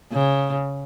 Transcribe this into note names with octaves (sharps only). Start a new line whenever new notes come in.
C#3